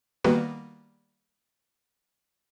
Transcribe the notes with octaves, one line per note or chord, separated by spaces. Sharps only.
D#3 G3 A#3 B3 F#4 B4